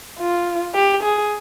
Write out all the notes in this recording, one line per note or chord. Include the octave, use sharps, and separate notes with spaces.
F4
G4
G#4